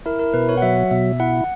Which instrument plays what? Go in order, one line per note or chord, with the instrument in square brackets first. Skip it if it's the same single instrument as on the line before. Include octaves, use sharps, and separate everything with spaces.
[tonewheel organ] E4 [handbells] A#4
[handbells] A#4
[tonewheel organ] B2 [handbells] B4
[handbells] C#5
F#5
[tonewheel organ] F#3 [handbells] E5
[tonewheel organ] B2 [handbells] E5
[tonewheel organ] E4 [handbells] F#5